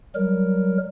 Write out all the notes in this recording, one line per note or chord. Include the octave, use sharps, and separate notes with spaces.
F#3 G3 A#4